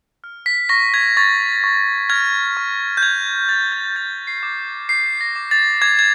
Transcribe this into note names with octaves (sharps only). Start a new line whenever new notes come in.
F6
B6
C#6 A#6
G#6
C#6 A6
C#6
F6 G#6
C#6
G6
F6 G#6
F6 A6
G#6
G6 A6
C7
D6
G6 C7
A#6
D6
A6
D6 G#6
G#6